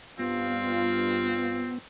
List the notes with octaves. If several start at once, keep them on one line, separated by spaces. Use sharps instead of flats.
G2 B3 C4 F4